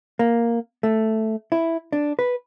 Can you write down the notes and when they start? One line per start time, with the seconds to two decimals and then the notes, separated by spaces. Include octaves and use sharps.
0.19 A#3
0.83 A3
1.52 E4
1.92 D4
2.19 B4